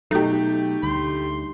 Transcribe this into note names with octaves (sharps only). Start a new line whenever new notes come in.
B2 F#3 A3 D#4 G4
D2 D3 G3 C6